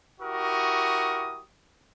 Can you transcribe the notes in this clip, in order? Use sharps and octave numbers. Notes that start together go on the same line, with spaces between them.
E4 F#4 G4 A#4 C#6 D#6